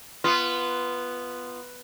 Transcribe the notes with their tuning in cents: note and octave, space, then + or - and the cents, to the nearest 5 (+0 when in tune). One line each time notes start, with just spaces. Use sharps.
B3 +0 F4 -15